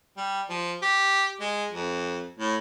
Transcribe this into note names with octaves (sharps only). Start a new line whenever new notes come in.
G3
F3
G4
G#3
F2
A2